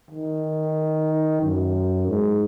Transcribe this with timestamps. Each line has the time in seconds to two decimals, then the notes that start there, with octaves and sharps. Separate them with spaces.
0.10 D#3
1.43 F#2
2.08 G#2